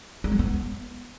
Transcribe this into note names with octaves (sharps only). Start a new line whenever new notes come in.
G#3
F#3
B3